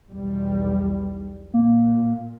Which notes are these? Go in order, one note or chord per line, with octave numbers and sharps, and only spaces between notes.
B1 E2 G3
A#2 A#3